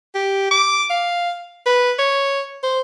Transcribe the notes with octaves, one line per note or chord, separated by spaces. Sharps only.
G4
D6
F5
B4
C#5
C5